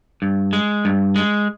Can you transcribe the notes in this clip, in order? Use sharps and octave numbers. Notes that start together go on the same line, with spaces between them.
G2
G#3
G2
G#3